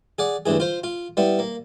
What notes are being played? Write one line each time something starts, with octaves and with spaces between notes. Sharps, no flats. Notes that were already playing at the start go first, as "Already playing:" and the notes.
G#4 D5 F#5
D2 G2 E3 G#4
F4 C5
F4
G3 B3 E4
A#3